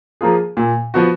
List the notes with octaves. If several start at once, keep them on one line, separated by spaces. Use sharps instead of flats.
F3 A#3 F4 G#4
A#2
F3 B3 F#4